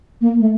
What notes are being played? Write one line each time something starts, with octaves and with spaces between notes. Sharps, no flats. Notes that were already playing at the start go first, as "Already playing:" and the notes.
A#3
A3